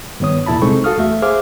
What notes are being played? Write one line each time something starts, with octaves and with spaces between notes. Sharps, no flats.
G2 D#3 B3 C#5 D#6
E2 A#2 E4 A5 B5
C2 G#3 C4 D#4 A4 C#6
F#4 A4 F5 D#6 F6
E2 A3 E5
G#4 C5 E5 F5 D6 F6